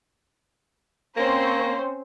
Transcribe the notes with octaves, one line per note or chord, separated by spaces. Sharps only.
A#3 C4 C#4 C5